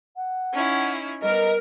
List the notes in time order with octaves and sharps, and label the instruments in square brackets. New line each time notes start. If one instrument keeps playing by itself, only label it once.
[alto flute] F#5
[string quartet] C#4 D#4 E4
[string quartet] G3 B3 [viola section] A#4 [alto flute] D#5